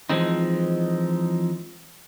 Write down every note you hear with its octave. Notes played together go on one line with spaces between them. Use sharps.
E3 F3 G#3 C4 D#4